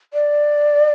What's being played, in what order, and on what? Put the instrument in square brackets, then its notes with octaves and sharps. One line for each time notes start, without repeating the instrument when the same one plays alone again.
[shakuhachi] D5